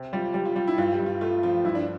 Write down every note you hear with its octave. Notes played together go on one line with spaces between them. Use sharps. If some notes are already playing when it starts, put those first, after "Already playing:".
Already playing: C3
G3 F4
G3 G4
F4
G3 F4
E4
G2 F4
G4
G2
F4
A3 F4
F3 F4
G2 E4
D4